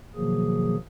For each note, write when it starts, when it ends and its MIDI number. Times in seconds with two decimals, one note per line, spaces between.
0.15 0.76 47
0.15 0.76 51
0.15 0.76 53
0.15 0.76 54
0.15 0.76 58
0.15 0.76 68